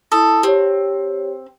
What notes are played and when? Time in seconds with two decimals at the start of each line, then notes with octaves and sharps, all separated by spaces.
0.12 E4 A4 D#6
0.43 C4 G4 C#5